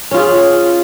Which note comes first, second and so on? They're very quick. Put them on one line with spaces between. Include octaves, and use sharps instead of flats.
C#4 F4 G#4